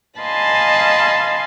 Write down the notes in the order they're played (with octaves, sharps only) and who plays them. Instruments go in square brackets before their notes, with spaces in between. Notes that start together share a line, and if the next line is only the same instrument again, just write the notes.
[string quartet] D#5 F5 G#5 A5 B5 C6